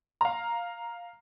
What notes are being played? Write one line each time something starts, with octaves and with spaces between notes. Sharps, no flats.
F5 A#5